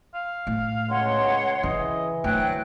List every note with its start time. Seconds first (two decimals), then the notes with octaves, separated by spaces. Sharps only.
0.15 F5
0.47 A2
0.89 C#2 C#5 F#5 C6
1.63 C#3 E3 D#5
2.24 D2 F#3 G5 F#6